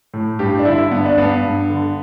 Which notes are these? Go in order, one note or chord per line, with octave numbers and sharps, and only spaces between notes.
A2
G2 G4
D4
D3 E4
G2 B3
D4
G2 B3
G2
D3